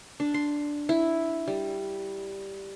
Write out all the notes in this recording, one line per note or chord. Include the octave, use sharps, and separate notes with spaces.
D4
C6
E4
G3